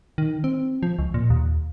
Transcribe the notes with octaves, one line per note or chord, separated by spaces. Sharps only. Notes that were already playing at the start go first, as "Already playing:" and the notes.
D#3
C4
F3
C#2
A#2
D#2